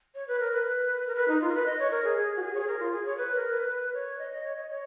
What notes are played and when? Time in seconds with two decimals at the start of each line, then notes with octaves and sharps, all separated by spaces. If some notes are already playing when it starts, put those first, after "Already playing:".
0.15 C#5
0.28 B4
0.40 A#4
0.53 B4
1.07 A#4
1.16 B4
1.28 D#4
1.41 F4
1.49 A#4
1.54 B4
1.66 D#5
1.79 C#5
1.91 A#4
2.04 G#4
2.17 G#4
2.37 F#4
2.41 G#4
2.55 C#5
2.61 G#4
2.68 A#4
2.80 F4
2.92 G#4
3.05 C#5
3.18 B4
3.35 A#4
3.51 B4
3.68 B4
3.94 C#5
4.19 D#5
4.32 D#5
4.44 C#5
4.56 D#5
4.70 C#5